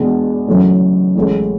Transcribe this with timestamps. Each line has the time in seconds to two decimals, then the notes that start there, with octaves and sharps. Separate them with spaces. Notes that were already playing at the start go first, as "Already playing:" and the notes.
Already playing: E2 B2 G#3 D4
0.47 F#1 F#2 E3 A3 C#4
1.16 A1 A2 G#3